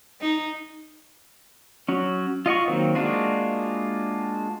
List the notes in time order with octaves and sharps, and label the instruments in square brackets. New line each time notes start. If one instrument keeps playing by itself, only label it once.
[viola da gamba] D#4
[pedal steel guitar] F#3 C#4
F4 D#5 F#5 C#6
D#3 F#3 A#3 C4
G#3 A#3 D4 F4 F#4